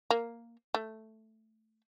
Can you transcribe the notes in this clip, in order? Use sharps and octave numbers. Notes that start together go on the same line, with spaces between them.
A#3
A3